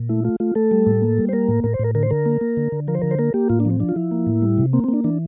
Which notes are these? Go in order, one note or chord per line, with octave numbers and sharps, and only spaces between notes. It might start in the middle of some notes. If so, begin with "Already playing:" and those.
Already playing: A#2
A3 E4
A3 F4
A3 F4
A3 A4
G3
A2
A#3
G3
C5
A#3 A#4
A2
A2 A#4
C5
A2 A#4
D3 A#4
C5
D3 A#4
A#3
A#3
D3
D3
F3 A#4
C5
D3 A#4
C5
A#3 A#4
A#3 G4
A2 F4
D4
F3
C4
F3 D4
F4
F3 E4
A#3
A2
G3
C3
A#3 C4
C4
A#3
D4
E3 D4